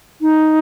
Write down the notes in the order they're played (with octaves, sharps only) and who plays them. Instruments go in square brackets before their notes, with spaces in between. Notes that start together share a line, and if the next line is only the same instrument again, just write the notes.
[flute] D#4